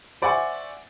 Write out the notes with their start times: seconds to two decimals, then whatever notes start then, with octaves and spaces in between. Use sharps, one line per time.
0.22 C5 D5 E5 F#5 G#5 C#6